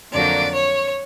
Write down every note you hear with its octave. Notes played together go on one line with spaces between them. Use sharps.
F2 D3 F#3 A#3 D5
C#5